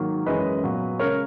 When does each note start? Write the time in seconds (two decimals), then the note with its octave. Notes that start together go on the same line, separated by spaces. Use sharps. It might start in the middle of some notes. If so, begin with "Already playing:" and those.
Already playing: G#2 D#3 F#3 A#3
0.26 F#2 E3 G#3 C#4 B4 D#5
0.63 A#2 F#3 B3
0.99 C#3 G#3 A#4 C#5